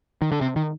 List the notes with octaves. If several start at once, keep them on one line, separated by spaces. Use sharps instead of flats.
D#3
D3
C3
D#3